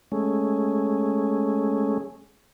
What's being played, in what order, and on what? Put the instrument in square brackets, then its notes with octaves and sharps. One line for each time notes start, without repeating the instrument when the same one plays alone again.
[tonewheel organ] G#3 A3 C#4